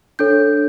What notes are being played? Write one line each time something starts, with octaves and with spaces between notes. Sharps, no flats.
D4 A4 C#5 G6